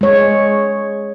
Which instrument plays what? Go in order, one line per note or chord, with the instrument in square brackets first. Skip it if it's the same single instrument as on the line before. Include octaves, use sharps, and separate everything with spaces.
[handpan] G#3 C#5